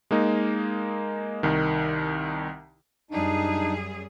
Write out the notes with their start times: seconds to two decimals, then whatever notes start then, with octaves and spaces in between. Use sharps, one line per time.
0.11 G#3 A#3 D#4
1.43 C2 D#3
3.11 F#2 G3 D4 D#4 G#4